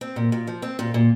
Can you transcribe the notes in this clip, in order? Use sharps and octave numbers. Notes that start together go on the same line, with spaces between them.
C4
A#2
A#2
F3
C4
A#2
A#2